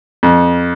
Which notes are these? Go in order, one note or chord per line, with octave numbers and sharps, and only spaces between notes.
F2